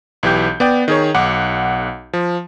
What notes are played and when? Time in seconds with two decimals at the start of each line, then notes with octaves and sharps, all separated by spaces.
0.23 B1 E3 G4 G6
0.60 B3 D5 G5
0.88 D#3 G#4 C#5
1.14 B1 F#5 D6
2.13 F3